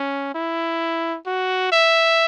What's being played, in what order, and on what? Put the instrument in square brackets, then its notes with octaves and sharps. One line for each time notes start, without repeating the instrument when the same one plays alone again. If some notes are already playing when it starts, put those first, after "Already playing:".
Already playing: [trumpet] C#4
E4
F#4
E5